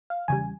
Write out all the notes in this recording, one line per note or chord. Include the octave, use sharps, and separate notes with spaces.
F5
E2 C#3 G3 G#5